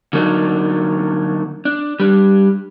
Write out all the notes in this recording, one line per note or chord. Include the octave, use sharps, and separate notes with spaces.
D3 F#3 A#3 D4 D#4
D4
G3 D4